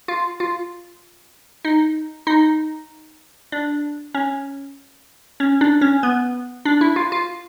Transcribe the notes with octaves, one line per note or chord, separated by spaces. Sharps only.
F4
F4
D#4
D#4
D4
C#4
C#4
D4
C#4
B3
D4
E4
F4
F4